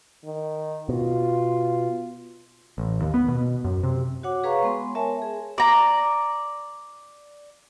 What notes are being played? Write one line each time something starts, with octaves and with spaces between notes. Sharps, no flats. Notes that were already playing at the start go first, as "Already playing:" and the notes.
D#3
B2 F4
A1
D#2
B3
B2
F#2
C3
F#4 C#5 F#5 D6
G#4 B4 C#5 F5 A#5 C#6
G#3 B3 C6
A#4 C#5 E5 G#5 A5
G#4
D5 A#5